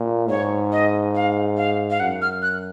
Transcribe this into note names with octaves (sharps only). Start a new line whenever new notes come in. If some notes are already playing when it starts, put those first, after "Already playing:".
Already playing: A#2
G#2 C#5
D#5
F5
F5
F5
F#2 F#5
F6
F#6